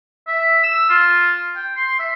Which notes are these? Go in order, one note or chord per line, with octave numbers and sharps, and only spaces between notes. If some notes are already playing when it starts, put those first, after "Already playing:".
E5
E6
F4
G5
C6
E5